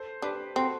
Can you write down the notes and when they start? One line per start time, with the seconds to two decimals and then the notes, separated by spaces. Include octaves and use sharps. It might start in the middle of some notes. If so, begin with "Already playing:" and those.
Already playing: A4 C5
0.22 D4 G4 B4
0.56 C4 F#4 A4